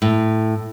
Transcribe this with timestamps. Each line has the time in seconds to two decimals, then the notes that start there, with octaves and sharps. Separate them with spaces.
0.02 A2